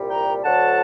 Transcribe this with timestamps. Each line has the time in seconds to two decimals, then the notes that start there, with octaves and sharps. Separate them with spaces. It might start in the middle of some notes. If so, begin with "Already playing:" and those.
Already playing: C2 A#2 G3
0.09 G5 A#5
0.43 D2 D3 F#3 F#5 A5